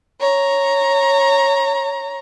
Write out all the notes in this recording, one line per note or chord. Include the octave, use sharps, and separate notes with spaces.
C#5 A#5